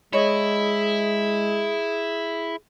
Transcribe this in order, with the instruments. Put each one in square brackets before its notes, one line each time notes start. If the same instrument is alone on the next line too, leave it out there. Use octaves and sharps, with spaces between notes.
[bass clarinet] G#3 [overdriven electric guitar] E4 [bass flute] G#4 [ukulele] C#5 D#5